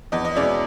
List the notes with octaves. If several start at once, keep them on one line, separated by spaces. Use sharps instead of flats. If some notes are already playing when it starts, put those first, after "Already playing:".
E2 D#5
D#5
B2 G#3 C#4 E4 D5